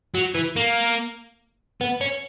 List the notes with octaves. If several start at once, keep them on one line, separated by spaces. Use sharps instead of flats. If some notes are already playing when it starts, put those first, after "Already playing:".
F#3
E3
A#3
B3
C#4